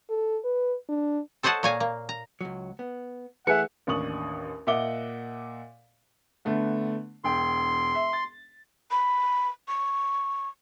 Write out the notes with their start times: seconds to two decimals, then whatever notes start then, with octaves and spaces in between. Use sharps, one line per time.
0.10 A4
0.44 B4
0.89 D4
1.43 A4 C5 C#5 D#5 F#5 A5
1.63 A#2 A#3 C#5 F5 G#5 A#5
1.80 A#3
2.09 A#5
2.41 C#2 F#3
2.79 B3
3.47 E3 A3 G#4 B4 E5 F#5 G#5 C#7
3.87 A1 D#2 D4 C#6 D#6 F#7
4.67 A#2 D#5 E5 F#5 D6 G7
6.45 D3 A3 B3
7.24 E1 G5 C6
7.95 E5
8.13 A6
8.91 B5
9.68 C#6